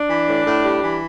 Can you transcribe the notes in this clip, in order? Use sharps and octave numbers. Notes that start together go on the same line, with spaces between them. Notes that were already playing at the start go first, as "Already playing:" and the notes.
Already playing: D4
E3
A2
A2
G3
E3